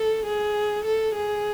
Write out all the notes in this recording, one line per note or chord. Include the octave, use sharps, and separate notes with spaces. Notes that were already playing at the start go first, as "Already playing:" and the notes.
Already playing: A4
G#4
A4
G#4